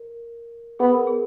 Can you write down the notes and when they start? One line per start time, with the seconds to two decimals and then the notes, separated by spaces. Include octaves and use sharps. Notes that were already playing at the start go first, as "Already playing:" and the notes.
Already playing: A#4
0.79 B3 G#4
0.94 A#4
1.07 G#4